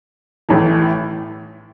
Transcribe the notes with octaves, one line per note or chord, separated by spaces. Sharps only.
A1 A2 E3